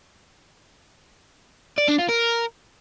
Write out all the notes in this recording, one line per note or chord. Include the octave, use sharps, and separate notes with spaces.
D5
D4
F4
A#4